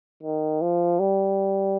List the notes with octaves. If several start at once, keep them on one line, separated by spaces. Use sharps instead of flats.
D#3
F3
G3